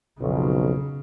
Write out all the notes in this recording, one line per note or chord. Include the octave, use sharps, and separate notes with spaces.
B1 F2 C#3